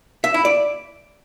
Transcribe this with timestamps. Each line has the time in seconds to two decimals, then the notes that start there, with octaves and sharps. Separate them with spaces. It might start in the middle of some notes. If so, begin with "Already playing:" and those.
0.24 E5
0.34 E4
0.45 D5